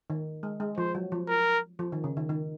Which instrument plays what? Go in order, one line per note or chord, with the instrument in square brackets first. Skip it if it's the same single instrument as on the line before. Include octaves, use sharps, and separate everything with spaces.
[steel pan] D#3
G#3
G#3
[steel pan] F3 [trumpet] C5
[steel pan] F#3
F3
[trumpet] A#4
[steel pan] F3
D#3
C#3
D#3
D#3